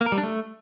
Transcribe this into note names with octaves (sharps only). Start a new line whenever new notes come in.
A#3
A#4
G3
D4
A3